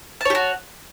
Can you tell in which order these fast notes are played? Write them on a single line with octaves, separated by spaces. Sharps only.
A5 C#5 G4 F#4